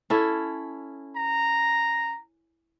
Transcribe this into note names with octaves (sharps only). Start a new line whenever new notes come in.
C#4 E4 A4
A#5